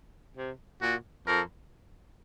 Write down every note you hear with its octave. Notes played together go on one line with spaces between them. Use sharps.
C3
A#2 F#4
F2 A#4